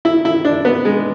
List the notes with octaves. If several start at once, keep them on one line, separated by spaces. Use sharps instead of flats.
E4
E4
D4
B3
G#3